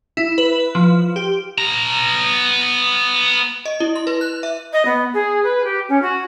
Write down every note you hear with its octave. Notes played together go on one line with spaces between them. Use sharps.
E4
B4
F3
G4
B3 A#5
D#5
E4
C6
B4
F#6
E5
D#5
B3
G#4
B4
G4
C#4
F#4